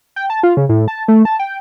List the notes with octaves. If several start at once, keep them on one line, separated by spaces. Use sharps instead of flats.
G5
A5
F4
C#3
A2
A5
A3
A5
G5